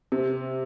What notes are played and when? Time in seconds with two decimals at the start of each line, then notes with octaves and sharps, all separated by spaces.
0.12 C3